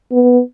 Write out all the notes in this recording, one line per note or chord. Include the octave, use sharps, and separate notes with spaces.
B3